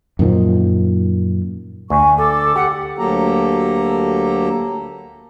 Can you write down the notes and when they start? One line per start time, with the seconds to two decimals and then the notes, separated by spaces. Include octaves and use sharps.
0.19 F#2 A#2 D#3 F3
1.90 D2 G#5 C#6
2.18 A4 D6
2.56 G4 F#5
2.98 D2 F#3 A#3 G4 A4 A#5